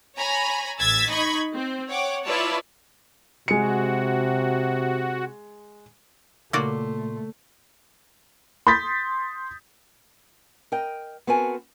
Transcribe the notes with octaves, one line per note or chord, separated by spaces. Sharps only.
C#5 G#5 A#5 B5
A1 E6 G#6 A6 B6
D#4 D#5 B5 C#6 G#6
C4
C#5 F#5 G5 D6
E4 F4 B4 C#5 D5 A5
C3 G#3 F#4 C#7
A#2 C#3 A3 A#3 F#4 D5 C6
C6 D#6 G6 A6 B6
A#4 D#5 G5
B3 C4 F#4 A4 A#4 G#5